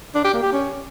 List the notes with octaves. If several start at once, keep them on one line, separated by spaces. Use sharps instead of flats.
D4
G4
A#3
G4
C#4